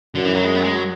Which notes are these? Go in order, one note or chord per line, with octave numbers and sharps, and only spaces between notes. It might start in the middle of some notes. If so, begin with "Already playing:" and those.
F#2 D3
E3
F#3
G#3
B3
F#3
G#3
F#3